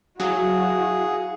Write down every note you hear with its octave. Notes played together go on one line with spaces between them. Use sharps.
F#3 E4 F#4 G#4 F5 F#5